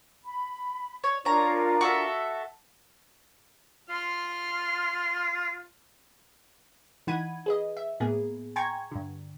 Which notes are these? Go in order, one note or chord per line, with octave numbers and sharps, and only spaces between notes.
B5
C#5
D4 F4 A#4 C#5 A#5
F#4 A4 E5
F4 C6 F6
E3 D#4 F#5 B5 G#6 D#7
G#4 B4 D#5
E5
A2 A#3 B3 G#4
G5 G#5 A#5 C6 C#6 G#6
G2 D3